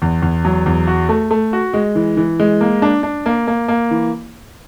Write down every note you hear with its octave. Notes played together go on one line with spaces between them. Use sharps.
E2
E2
F#3
E2
F#4
A3
A3
F#4
G#3
E3
E3
G#3
A#3
D4
D4
A#3
A#3
A#3
E3